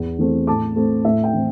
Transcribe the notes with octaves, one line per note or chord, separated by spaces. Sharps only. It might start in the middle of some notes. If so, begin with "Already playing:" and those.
Already playing: E2
E3 A3 C4
A2 A5 D6
A3 C4
A2 E5
G5
E3 C4